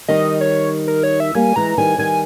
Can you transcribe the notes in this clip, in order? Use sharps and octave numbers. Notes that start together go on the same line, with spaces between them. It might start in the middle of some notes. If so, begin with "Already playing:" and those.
D#3 G3 D#5
C#5
A#4
C#5
E5
G3 A#3 G#5
E3 G#3 A#5
D#3 G3 G#5
D#3 G3 G#5